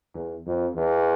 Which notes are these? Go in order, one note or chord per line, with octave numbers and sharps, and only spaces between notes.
E2
F2
E2